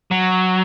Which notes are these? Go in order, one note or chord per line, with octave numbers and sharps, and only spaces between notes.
F#3